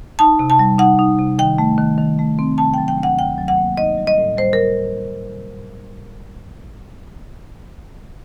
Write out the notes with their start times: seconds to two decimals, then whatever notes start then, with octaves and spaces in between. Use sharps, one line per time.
0.19 D#4 A5
0.39 C3
0.50 A5
0.59 G3
0.78 D#4 F#5
0.99 D#4
1.19 C3
1.39 D#3 G5
1.58 A3
1.78 D#3
1.98 D#3
2.19 A3
2.39 C4
2.58 C3 A5
2.74 F#3 G5
2.88 G5
2.98 D2
3.03 F#5
3.18 D2 G5
3.38 F#3
3.48 F#5
3.58 A#3
3.77 D#4 D#5
3.98 G3
4.07 D#5
4.18 A2
4.37 G3 C5
4.53 G3 A#4